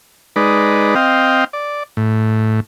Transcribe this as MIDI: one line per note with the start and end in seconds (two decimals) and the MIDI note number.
0.36 0.95 56
0.36 0.95 63
0.36 0.95 71
0.36 0.95 74
0.95 1.44 60
0.95 1.44 75
0.95 1.44 77
0.95 1.44 79
1.53 1.83 74
1.97 2.60 45